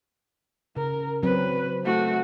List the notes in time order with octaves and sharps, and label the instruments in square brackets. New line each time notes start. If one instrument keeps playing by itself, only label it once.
[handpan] C#3 [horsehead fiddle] A#4
[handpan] F#3 C4 [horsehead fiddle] B4
[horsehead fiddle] A3 F#4